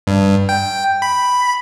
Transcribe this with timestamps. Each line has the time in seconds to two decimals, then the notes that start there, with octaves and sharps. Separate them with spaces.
0.07 G2
0.49 G5
1.02 B5